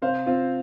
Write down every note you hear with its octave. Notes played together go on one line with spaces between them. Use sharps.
C3 C5 F5
C4 F4